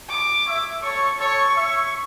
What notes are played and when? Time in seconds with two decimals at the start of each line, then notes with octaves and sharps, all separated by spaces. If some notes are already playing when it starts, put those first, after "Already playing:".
0.10 D6
0.45 C#5 E5
0.82 A4 C#5 C#6
1.19 A4 C#5 C#6
1.55 C#5 E5